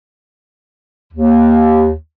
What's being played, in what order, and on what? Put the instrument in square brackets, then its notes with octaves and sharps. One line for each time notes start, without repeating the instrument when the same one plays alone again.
[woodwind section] D#2